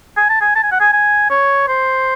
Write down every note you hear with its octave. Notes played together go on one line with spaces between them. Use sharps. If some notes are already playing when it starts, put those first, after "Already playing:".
G#5
A5
G#5
A5
G#5
F#5
G#5
G#5
C#5
C5